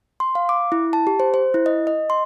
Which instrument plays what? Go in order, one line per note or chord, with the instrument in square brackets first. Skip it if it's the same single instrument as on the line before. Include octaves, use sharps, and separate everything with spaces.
[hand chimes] C6
F5
D6
E4
A5
G4
C5
C5
E4
D#5
D#5
C6